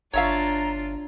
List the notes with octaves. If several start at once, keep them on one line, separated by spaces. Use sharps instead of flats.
G1 D4 F4 C#5 E5 F5 A#5